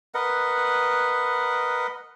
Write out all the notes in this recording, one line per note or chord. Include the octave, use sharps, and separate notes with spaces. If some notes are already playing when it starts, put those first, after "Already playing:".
A#4 B4 D#5 F#5